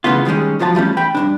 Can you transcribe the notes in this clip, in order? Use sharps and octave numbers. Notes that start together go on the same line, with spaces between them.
C#3 E3 A3 B3 F4
D#3 F3 G3 G#3 C#4
C2 F3 F#3 F4 A5
E3 G3 A3 C#4
G5 B5
G2 B2 D4